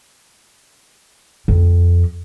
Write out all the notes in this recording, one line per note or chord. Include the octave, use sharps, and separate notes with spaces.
F2